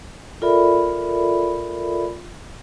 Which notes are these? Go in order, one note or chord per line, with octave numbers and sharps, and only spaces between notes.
F4 A4 A#4 D5 E5 B5